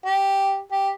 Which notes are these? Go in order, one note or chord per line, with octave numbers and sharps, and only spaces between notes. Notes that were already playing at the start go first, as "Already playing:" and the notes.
G4
G4